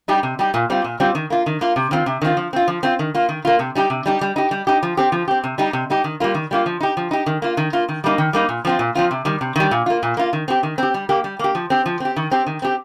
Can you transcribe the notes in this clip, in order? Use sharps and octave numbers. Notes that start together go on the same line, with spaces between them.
G3 D#4 G4
C3
G3 D#4 G4
A#2
G3 C4 F4
A#2
G3 C4 F4
D#3
A#3 F4
D#3
A#3 F4
C3
D#3 C4 F4
C3
D#3 C4 F4
F3
C4 F4
F3
C4 F4
D#3
A#3 F4
D#3
A#3 F4
C3
G3 D#4 G4
C3
G3 D#4 G4
G3
D#4 G4
G3
D#4 G4
F3
C4 G4
F3
C4 G4
C3
G3 D#4 G4
C3
G3 D#4 G4
D#3
G3 A#3 F4
D#3
G3 A#3 F4
F3
D#4 G4
F3
D#4 G4
D#3
A#3 F4
D#3
A#3 F4
D#3
G3 A#3 D#4
D#3
G3 A#3 D#4
A#2
F3 C4 F4
A#2
F3 C4 F4
C3
D#3 G3
C3
D#3 G3
A#2
A#3 F4
A#2
A#3 F4
D#3
C4 G4
D#3
C4 G4
G3
A#3 G4
G3
A#3 G4
F3
C4 G4
F3
C4 G4
D#3
C4 G4
D#3
C4 G4